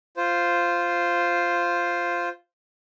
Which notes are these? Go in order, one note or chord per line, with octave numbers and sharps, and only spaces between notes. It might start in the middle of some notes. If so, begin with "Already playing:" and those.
F4 C5